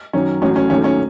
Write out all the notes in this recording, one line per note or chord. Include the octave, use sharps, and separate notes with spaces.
F#2 D#3 F#3 C#4
A1 A2 F#3 C#4
C#4
D#2 D#3 F#3 A3 C#4
C#4